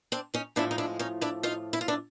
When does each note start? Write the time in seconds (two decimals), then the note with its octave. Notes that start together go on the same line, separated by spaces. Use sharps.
0.12 C4 D4
0.34 C#4 D#4
0.56 A2 F3 G#3 D4 E4
0.71 D#4
0.78 D4 E4
0.99 C#4 D#4
1.21 D4 E4
1.43 D#4 F4
1.73 E4
1.81 F4
1.88 D4 E4